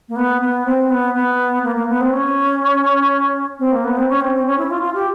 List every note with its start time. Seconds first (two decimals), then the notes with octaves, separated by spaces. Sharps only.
0.09 A#3
0.16 B3
0.41 B3
0.66 C4
0.90 B3
1.15 B3
1.64 A#3
1.76 A#3
1.89 B3
2.01 C4
2.13 C#4
3.59 C4
3.73 A#3
3.84 B3
3.97 C4
4.09 C#4
4.21 C4
4.34 C4
4.46 C#4
4.58 E4
4.70 F4
4.82 F4
4.94 G4